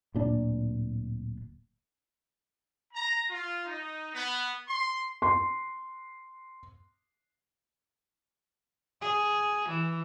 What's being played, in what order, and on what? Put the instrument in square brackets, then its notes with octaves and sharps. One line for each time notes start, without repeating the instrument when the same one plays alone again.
[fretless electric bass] D1 A#2 D4
[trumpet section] A#5
F4
D#4
B3
C6
[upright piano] C6 C7
[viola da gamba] G#4
E3